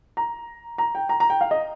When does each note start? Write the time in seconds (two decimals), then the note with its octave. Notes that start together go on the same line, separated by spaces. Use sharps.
0.17 A#5
0.78 A#5
0.95 G5
1.09 A#5
1.20 A#5
1.30 G5
1.41 F5
1.51 D#5